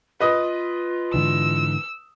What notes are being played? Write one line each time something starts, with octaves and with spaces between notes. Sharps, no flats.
F4 B4 D#5 D#6
G#2 D3 E3 E6